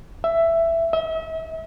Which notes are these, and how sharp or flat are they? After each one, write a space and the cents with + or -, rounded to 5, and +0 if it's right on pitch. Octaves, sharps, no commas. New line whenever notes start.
E5 +10
E5 -40